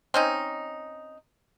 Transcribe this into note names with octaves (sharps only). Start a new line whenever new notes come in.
C4 C#4 D#4